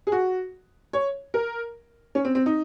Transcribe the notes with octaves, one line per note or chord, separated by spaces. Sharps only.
G#4
F#4
C#5
A#4
C#4
C4
C4
D#4